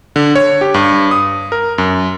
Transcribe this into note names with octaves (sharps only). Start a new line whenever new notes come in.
D3
C#5
G4
G2
D#6
A#4
F#2